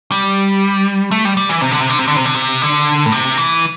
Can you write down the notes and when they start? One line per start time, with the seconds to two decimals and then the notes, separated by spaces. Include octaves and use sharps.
0.12 G3
1.11 A3
1.25 G3
1.37 G3
1.49 E3
1.62 C3
1.71 D3
1.80 C3
1.90 D3
1.99 C3
2.08 D3
2.17 C3
2.25 D3
2.34 C3
2.62 D3
3.06 A2
3.12 C3
3.38 E3